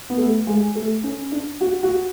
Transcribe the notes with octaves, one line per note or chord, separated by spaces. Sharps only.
B3
A3
G#3
A3
C#4
D4
F#4
F#4